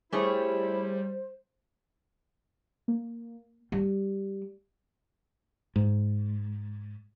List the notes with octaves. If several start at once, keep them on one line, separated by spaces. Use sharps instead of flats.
G3 A3 E4 G#4 C5 C#5
A#3
G3
G#2